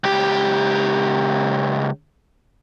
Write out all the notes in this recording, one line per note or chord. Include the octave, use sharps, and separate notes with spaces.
C#2 G4